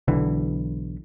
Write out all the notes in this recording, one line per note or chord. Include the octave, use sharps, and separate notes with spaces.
B1 D3 E3